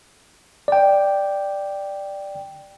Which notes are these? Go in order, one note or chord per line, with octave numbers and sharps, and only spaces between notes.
D5 G5